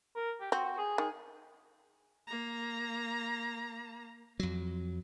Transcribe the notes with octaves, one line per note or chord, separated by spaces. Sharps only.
A#4
G4
C4 F#4
F#4
G#4
D#3 G#4
A#3 A#5
F2 F#3